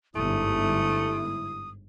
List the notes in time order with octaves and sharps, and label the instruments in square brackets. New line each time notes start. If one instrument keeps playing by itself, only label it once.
[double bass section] G1 G#2 [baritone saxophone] A3 [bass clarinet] E4 [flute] D#6